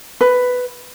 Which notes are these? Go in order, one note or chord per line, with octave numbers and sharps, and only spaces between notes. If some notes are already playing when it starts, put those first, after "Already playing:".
B4